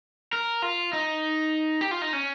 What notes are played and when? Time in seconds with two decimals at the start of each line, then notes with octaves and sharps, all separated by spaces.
0.33 A#4
0.62 F4
0.93 D#4
1.81 G4
1.91 F4
2.02 D#4
2.13 C#4